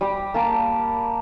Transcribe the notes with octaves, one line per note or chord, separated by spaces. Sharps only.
G3 G4
A#3 A5 D6